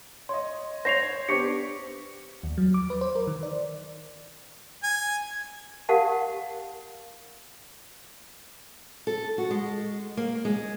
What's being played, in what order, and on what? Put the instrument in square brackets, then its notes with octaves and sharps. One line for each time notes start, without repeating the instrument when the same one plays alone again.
[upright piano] C#5 D#5 [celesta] C6
[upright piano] C5 C#5 [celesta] A#6 C7 F7
[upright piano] B3 D4 G4 [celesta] C5 C#6 C#7
[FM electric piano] D#2
F#3
D6
B4
C5
A#4
D#3
D5
[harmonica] G#5
[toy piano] G4 A#4 F5 F#5 A5
[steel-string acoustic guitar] A4
F#4
G#3
A#3
G#3